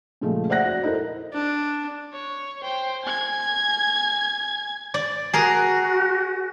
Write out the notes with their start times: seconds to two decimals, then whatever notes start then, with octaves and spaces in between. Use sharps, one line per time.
0.21 A#2 C#3 F3 G#3 A3
0.50 C5 D5 E5 F#5 F#6 A#6
0.66 F#4
0.83 D#4 E4 A4 A#4 C5
1.33 D4
2.13 C#5
2.63 C5 G5
3.03 G#5 G#6
4.94 D5
5.33 F#4 G#4 A#4